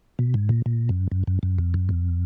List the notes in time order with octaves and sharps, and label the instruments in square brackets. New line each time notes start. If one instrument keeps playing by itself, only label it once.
[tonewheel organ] B2
G#2
A#2
A#2
F#2
F#2
F#2
F#2
F2
F#2
F2